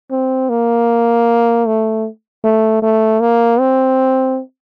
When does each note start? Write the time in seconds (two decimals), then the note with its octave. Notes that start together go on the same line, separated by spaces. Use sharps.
0.11 C4
0.50 A#3
1.67 A3
2.44 A3
2.82 A3
3.21 A#3
3.60 C4